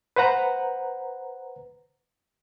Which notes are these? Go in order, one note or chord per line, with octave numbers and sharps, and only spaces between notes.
B4 C5 F#5 A#5